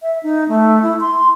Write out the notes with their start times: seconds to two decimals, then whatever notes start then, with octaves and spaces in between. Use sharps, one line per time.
0.02 E5
0.23 D#4
0.48 A3
0.83 E4
1.00 C6